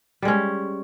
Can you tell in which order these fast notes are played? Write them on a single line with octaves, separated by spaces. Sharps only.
G3 G#3 C#4